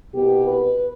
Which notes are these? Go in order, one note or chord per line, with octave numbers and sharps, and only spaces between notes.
C2 B2 B3 G4
B4